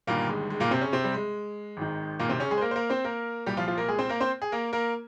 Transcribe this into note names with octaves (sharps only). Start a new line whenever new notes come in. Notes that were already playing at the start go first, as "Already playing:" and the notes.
G1 G2 A#2 D#3 A#3
G#3
G#3
A#2 A#3
C3 C4
C#3 C#4
C3 C4
G3
G#3
G#1 G#2 D#3
A#2 A#3
C3 C4
C#3 C#4
G#3 G#4
C5
A#3 A#4
C5
A#3 A#4
C4 C5
A#3 A#4
C2 A#2 G3 G4
F3 F4
F3 F4
A#3 A#4
G#3 G#4
C4 C5
A#3 A#4
C4 C5
G#4
A#3 A#4
A#3 A#4